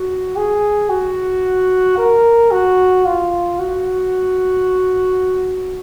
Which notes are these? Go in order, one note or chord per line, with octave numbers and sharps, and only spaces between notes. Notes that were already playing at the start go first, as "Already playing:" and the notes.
Already playing: F#4
G#4
F#4
A#4
F#4
F4
F#4